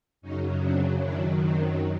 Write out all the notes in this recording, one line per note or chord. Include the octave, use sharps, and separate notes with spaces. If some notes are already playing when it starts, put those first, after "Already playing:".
F#2 C#3 F#3 C#4 D#4
C4 D4
F#2 D#3 F#3 D4 E4
C4